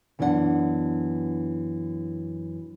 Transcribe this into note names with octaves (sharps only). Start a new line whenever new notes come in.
F#2 E3 B3 D4 F#4 F#5